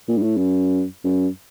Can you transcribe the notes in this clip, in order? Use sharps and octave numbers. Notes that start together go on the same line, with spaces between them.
A#2
G2
A2
F#2
F#2